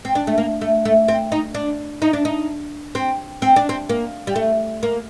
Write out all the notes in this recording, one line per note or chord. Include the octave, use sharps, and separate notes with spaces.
C4
D4
A3
A#3
A3
A3
C4
D#4
D4
D#4
D4
D#4
C4
C4
D4
C4
A#3
G3
A3
A#3